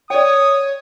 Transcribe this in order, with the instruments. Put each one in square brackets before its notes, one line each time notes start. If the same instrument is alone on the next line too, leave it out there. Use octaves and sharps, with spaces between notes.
[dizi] C#5 [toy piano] D5 G5 [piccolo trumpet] D#6